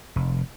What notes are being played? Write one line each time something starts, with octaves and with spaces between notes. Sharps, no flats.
F1